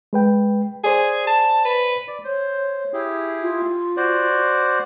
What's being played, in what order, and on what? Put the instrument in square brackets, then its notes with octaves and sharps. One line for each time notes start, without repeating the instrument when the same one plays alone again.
[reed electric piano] G#3 B4 G5
[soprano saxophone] G#4 [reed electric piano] C5 D5 G#5
[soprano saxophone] A5
B4
[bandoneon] D5
[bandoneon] C5 [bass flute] C#5
[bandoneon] E4 G4 G#4
[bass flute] F4
[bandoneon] F#4 C5 D5